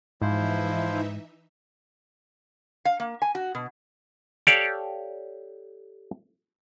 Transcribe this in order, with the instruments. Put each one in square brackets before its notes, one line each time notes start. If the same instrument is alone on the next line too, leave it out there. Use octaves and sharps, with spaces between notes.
[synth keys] G#2 [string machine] E3 D#4 E5 [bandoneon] F3 E4 C5
[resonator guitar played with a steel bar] F5
A#3
G#5
F#4
B2
[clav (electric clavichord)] G4 A4 C#5 D5 F5